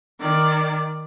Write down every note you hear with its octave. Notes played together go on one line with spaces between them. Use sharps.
D#3 D5